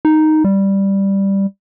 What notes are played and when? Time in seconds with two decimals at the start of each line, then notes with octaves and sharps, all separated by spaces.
0.05 D#4
0.44 G3